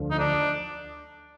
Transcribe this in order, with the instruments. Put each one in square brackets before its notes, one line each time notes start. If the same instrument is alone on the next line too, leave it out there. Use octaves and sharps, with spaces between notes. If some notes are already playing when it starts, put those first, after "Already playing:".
Already playing: [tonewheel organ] D2 D3 F3
[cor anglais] D#4
D4